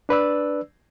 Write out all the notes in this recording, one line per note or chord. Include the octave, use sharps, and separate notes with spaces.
D4 B4 D5 E6